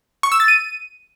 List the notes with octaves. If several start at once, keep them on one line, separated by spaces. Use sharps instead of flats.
C#6
E6
A6
D#7